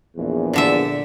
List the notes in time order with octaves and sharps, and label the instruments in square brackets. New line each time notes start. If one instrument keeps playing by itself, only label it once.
[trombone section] A#1 E2
[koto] A#2 D3 E5